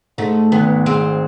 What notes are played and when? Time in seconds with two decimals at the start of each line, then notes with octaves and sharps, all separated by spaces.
0.18 G#2 A3
0.52 G#1 B3
0.86 G#3 C4